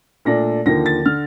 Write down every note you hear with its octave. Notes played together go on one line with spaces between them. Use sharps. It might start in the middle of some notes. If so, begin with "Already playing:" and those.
A#2 A3 D4 A#6
D#2 D3 F3 A#3 A#6
A6
D3 F6